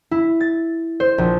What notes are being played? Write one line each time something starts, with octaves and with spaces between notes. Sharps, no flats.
E4
A6
C5
A#1